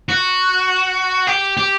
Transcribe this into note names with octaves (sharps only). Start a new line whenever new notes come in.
F#4
G4
G4